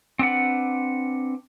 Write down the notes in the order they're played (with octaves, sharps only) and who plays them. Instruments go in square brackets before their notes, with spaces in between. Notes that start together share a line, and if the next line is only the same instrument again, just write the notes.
[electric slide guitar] C4 D4 B4 F#5